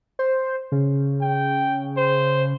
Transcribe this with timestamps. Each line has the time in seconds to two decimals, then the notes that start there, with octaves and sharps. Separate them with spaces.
0.19 C5
0.72 C#3
1.22 G5
1.97 C5